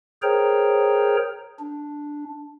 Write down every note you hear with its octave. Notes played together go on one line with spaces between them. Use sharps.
G#4 A#4 C5 C#5 G5 A#5
D4